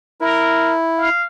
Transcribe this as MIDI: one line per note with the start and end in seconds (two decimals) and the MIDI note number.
0.21 1.09 64
0.21 0.74 70
0.98 1.26 77